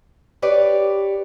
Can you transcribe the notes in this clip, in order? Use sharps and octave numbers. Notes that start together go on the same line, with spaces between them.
G4 B4 C#5 D5